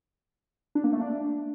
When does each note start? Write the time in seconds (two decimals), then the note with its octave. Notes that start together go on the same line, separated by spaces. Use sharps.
0.75 D4
0.84 A#3
0.93 A3
1.01 D4